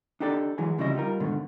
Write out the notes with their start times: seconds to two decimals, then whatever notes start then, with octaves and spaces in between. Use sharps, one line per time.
0.20 D4 D#4 G4 A4 D5
0.58 E3 F#3 G#3 G#4
0.78 D2 C#3 F3 G3 E4 D#5
0.95 G3 D#4 F4 A#4
1.20 G#2 B2 D3 D#3